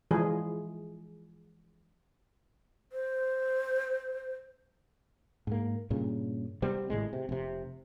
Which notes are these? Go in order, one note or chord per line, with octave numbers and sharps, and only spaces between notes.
E3 F3 G#3 G#4
C5
G#2 A#3
G2 A#2 C#3
C3 G3 B3 C4
G#1 A2 G#3
C3
F1 C3